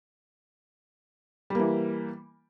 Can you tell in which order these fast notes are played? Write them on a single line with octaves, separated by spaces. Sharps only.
G3 A#3 E3